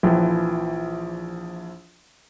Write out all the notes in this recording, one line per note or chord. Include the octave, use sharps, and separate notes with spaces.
A#1 E3 F3